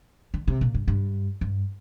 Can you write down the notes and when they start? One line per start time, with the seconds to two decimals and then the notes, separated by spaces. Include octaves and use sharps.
0.34 D3
0.48 C3
0.61 A#2
0.74 G2
0.88 G2
1.41 G2